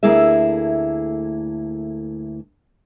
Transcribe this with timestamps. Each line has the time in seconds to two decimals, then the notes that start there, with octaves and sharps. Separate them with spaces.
0.03 D2 A3 A#3 E4 G#4 E5